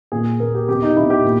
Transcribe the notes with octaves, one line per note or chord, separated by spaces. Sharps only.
A#2 G#4
A#2 A#4
G4
B2 G4
D#4
B2 E4
G4
A#2